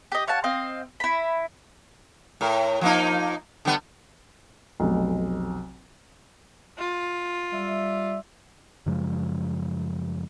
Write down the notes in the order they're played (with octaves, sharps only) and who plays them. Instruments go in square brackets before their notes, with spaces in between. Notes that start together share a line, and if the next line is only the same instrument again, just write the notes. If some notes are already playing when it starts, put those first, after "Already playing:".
[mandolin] G4 D#5
C#5 F5 F#5 A5
C4 D#5 F5
E4 B5
[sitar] A2 A#4
F3 A#3 D#4
D3 G3 B3
[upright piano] F1 B1
[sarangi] F4
[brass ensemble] G3 D5 E5
[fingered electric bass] F#2 C#3 F3 G#3